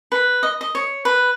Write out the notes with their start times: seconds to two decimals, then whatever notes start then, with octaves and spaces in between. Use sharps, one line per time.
0.12 B4
0.43 D#5
0.61 D#5
0.75 C#5
1.05 B4